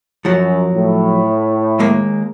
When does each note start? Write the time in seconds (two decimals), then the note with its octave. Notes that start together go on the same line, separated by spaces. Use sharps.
0.25 F#2 F3 F#3
0.73 A2
1.79 D#2 G#3 A#3